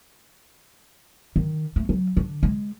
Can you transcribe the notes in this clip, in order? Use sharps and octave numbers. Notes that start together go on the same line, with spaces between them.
D#3
A3
F#3
D3
G#3